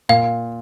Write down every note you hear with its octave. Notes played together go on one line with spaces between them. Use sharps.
A#2 F5